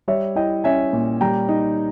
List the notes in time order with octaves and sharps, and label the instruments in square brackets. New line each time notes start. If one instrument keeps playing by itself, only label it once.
[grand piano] G3 C#5 E5
E4 D#5 G5
C#4 E5 G#5
A#2
G3 G5 A#5
D#4